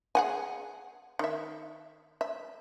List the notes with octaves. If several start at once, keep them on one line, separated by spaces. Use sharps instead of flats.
G#4 F#5 G#5
D#3 E5
E5